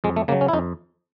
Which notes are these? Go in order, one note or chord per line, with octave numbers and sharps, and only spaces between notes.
F2 G#3
A3
C#3 F#3 A#3
C#4
E4
F2 D#4